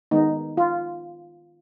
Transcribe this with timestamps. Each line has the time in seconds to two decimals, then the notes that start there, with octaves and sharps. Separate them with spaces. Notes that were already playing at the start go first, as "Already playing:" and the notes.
0.11 D#3 G#3 B3 D#4
0.57 F4